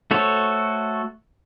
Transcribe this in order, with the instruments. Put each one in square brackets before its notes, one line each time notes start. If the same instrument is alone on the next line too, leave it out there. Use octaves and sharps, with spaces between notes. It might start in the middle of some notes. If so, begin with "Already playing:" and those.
[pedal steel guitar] A3 F#4 A4 C5 C#5